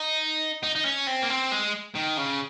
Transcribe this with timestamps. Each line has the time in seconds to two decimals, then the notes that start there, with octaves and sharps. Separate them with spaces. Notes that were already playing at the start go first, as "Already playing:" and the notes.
Already playing: D#4
0.64 D#4
0.76 D#4
0.86 C#4
1.07 C4
1.22 A#3
1.30 C4
1.52 G#3
1.95 D#3
2.18 C#3